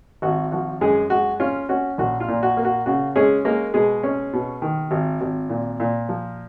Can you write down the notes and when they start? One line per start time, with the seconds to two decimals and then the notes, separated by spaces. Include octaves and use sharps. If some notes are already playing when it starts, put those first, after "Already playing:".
0.22 G#1 F#4
0.52 F3 F#4
0.81 F#2 G#3 G#4
1.10 G#3 F#4
1.40 C#4 F4
1.69 C#4 F#4
1.98 A#1 F#4
2.20 F4
2.28 A#2
2.43 F#4
2.57 A#3
2.65 F#4
2.86 C#3 F#4
3.16 G#3 C#4 G#4
3.45 G#3 A#3 A#4
3.74 B2 G#3 G#4
4.04 C#4
4.33 B2
4.62 D#3
4.91 G#1
5.21 G#1
5.49 A#2
5.80 A#2
6.09 F3